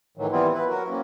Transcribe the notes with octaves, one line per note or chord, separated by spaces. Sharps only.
A2 D#3 E3 F#3
E3 G3 B3 C4 E4 F4
E4 B4
F#3 F#4 A#4
A#3 C4 C#4